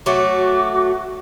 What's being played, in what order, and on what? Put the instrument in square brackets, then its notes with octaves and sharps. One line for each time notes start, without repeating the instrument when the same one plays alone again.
[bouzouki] F#3 A3 [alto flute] F#4 [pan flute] D6